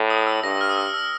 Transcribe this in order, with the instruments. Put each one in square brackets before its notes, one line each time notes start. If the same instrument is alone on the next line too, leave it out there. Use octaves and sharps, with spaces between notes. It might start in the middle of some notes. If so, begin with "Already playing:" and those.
Already playing: [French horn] A2
[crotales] D#6
E6
[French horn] G2 [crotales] A#6
[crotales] F6
D#6
E6
E6